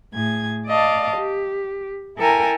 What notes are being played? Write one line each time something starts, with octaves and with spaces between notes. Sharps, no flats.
A2 G#4 G#6
D5 D#5 F5 A5
G4
E4 A4 A#4 G5 G#5 A#5